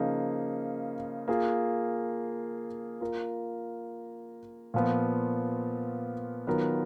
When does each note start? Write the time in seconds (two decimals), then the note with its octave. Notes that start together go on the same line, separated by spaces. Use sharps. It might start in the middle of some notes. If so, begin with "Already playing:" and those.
Already playing: C#3 F3 A#3 D#4
1.28 A#3 F4 G#4
3.01 A#3 F4 A#4
4.74 A#2 F3 B3
6.47 D#3 F#3 B3 F4 A#4